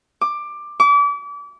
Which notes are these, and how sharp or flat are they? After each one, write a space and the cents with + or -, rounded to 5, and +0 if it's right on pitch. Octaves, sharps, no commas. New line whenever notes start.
D6 +15
D6 -35